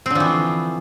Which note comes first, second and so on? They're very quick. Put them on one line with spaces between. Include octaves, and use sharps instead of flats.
C4 D3 F3 E3